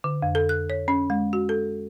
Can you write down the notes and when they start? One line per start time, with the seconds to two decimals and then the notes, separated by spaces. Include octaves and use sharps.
0.04 D3
0.23 F2
0.35 A4
0.49 F#6
0.70 C#5
0.88 C#4
1.10 G#3
1.33 F#4
1.49 A4